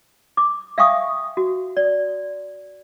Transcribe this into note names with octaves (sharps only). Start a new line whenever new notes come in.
D6
E5 F5 G5 G#5 C#6 D#6
F#4
D5